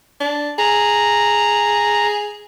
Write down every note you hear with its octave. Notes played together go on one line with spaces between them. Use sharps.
D4
G#4 A#5